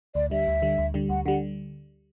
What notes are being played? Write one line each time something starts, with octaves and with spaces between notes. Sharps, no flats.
D2 D5
D3 G3 E5
D2
D3 G3
D2
D3 G3
D2 F#5
D3 G3 F#5